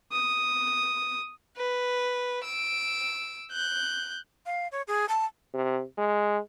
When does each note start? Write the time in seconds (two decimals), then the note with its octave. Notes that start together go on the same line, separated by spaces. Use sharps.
0.12 D#6
1.57 B4
2.44 E6 D7
3.51 F#6 G6
4.46 F5
4.72 C#5
4.88 G#4
5.09 A5
5.54 C3
5.98 G#3